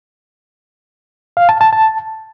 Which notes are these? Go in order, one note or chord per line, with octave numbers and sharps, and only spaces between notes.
F5
A5
A5
A5